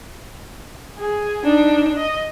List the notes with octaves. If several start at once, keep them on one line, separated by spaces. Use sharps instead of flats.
G#4
D4 D#4
D#5